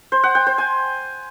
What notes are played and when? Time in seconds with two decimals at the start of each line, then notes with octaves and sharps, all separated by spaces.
0.12 C5
0.23 F#5
0.35 G5
0.47 C5
0.58 G#5